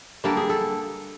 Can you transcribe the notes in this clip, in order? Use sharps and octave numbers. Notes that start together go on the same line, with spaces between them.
D3 G3 A#3 A4
G#4
A4